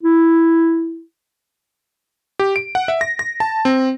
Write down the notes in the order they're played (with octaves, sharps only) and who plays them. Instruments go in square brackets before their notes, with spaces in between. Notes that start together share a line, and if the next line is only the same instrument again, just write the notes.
[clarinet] E4
[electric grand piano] G4
D7
F#5
E5
A#6
A#6
A5
C4